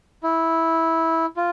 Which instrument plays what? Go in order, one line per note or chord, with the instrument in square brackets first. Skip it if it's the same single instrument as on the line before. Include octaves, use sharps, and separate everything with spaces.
[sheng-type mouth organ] E4
F4